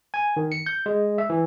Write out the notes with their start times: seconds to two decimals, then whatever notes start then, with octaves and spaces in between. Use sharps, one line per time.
0.14 G#5
0.36 D#3
0.52 C#7
0.66 G6
0.86 G#3
1.18 E5
1.30 E3